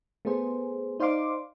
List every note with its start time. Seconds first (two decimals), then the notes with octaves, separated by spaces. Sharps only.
0.25 A3 B3 G#4 C5
1.00 D#4 C5 D5 F5 C6 D6